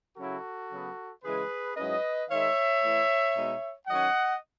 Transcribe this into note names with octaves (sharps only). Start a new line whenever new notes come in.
C#3 F#3 C#4 E4 F#4 A4
C#3 F#3 B3
C#3 E3 G#3 G#4 B4
G#2 F#3 C#4 E4 B4 D#5
D#3 G#3 D#4 C#5 E5
E3 A3 E4
B2 G#3 D#4
D#3 F#3 C#4 D#5 F#5